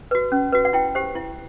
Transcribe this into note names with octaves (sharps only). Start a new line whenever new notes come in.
F#4 B4
C#4
F#4 B4
F#5
E4 G5
G4 C5
E4